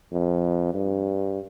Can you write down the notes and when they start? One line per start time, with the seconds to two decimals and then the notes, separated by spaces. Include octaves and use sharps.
0.12 F2
0.74 G2